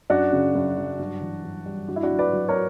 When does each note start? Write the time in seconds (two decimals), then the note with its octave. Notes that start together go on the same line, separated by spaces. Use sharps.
0.10 F#2 D4 F#4
0.32 C#3
0.55 F#2
0.77 F#3
0.99 G2
1.21 E3
1.44 G2
1.66 G3
1.88 G2 F#4
1.96 E4
2.03 D4 F#4
2.11 F#3
2.19 B4 D5
2.33 F#3
2.49 A#4 C#5